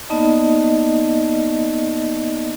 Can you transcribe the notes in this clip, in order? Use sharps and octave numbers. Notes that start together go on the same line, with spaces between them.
A#3 B3 D#4 D5 D#5 A5